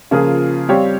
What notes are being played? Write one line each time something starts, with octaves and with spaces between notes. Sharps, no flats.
C#3 F3 A#3 F4 G#4
G3 C4 G4 C#5 F5